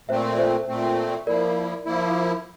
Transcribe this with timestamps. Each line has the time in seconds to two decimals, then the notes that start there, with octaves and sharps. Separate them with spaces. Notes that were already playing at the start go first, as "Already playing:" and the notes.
0.09 A#2 A3 C4 C5 E5
0.33 D5
0.39 C5 E5
0.68 A#2 A3 C4
1.27 F3 A#3 E4 A#4 D5
1.85 F3 A#3 E4